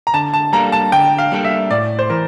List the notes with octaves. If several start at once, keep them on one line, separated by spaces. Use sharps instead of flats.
A#5
D3 A5
A5
G3 A#3 D4 A4 A#5
A5
D3 G5
F5
G3 A#3 D4 A4
E5
A2 D5
C5
E3 A#4